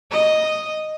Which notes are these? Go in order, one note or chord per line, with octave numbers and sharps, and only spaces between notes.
D#5